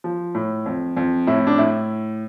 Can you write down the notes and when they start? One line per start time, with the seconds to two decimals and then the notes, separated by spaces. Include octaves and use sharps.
0.04 F3
0.35 A2
0.66 F2
0.97 F2
1.27 A2 E4
1.47 D4
1.58 A2 E4